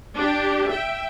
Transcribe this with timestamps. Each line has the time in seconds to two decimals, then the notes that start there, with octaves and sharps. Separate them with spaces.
0.15 D4 G4
0.70 E5 G5